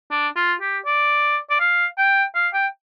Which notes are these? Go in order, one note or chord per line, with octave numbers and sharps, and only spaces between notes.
D4
F4
G4
D5
D5
F5
G5
F5
G5